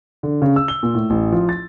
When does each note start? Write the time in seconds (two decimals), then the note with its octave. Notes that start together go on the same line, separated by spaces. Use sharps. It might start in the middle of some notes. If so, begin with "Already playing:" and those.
0.23 D3
0.42 C#3
0.56 E6
0.68 G7
0.83 A#2
0.94 A2
1.10 A1
1.32 F3
1.49 A6